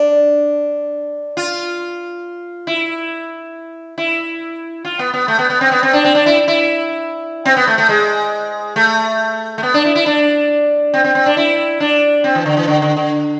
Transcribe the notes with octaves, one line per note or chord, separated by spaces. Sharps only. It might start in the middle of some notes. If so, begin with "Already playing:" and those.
Already playing: D4
F4
E4
E4
F4
B3
B3
A3
B3
B3
C4
B3
C4
D4
C4
D4
E4
E4
C4
B3
A3
A3
G#3
A3
A3
B3
D4
E4
E4
D4
C4
C4
C4
D4
E4
D4
C4
E3
D3
E3
D3
D3
D3